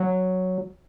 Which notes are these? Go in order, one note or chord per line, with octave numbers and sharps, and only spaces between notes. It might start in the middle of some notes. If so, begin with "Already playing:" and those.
Already playing: F#3